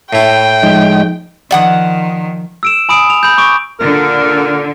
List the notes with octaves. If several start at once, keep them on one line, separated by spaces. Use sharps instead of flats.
A2 E4 G5
F3 G#3 D#4
D#3 F3 D5 F#5 D#6
E6 D7 E7
G#5 B5 D#6 D7
F7
B5 G6
C#6 D6 D7
A#2 D3 A#4